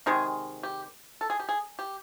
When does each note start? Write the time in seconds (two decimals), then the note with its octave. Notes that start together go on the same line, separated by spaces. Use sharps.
0.06 C3 D#3 G#3 G#4
0.63 G4
1.21 A4
1.30 G#4
1.40 G4
1.49 G#4
1.79 G4